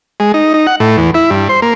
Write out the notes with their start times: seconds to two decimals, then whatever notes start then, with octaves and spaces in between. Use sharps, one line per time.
0.20 G#3
0.34 D#4
0.54 D#4
0.67 F#5
0.80 A2
0.97 E2
1.14 E4
1.30 G2
1.49 C5
1.62 A#3